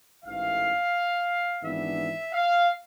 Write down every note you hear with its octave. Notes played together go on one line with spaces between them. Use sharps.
A1 G#2 E3 A3 F5
G#1 G#2 E3 B3 D4 E5
F5